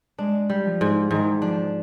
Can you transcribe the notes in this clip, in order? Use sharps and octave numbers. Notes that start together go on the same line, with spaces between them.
G#3 D4
G3
F3
G#2
G#2 D#3
F3 D4